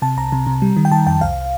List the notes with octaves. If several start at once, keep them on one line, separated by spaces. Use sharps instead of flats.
C3 A5
C2 A#5
C3
C3
G3
D#3
G5
D#3 A5
F2 G5
C2 F5